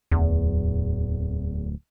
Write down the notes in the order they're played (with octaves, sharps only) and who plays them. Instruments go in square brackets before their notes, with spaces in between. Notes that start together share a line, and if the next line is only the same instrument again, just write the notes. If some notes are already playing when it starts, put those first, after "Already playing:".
[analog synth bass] D1 [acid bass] E2